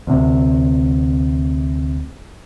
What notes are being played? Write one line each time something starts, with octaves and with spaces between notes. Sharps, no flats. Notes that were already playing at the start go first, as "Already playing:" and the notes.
D2 C3